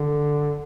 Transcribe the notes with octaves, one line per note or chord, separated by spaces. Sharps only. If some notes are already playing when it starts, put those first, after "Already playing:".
Already playing: D3